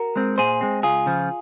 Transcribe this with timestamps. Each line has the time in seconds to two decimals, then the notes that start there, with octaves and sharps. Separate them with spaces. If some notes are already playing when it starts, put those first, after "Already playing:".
Already playing: F#4 A#4
0.16 G#3 C4
0.38 A#2 G#4 C5
0.61 G#3 C4
0.83 C#2 F4 G#4
1.06 C#3 F3